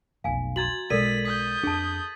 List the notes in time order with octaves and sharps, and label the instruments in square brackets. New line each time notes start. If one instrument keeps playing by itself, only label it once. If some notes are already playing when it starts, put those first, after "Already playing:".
[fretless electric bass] F1 B1 [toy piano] F5 G#5
[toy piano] F#4 A#5 C6 [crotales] G#6 A6 F#7
[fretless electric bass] B1 B2 G#3 [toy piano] A4 A#4 D5 [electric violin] B6 [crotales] D#7
[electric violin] D#6 G6 [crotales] B6
[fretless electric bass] F2 D4 [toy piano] G#4 A5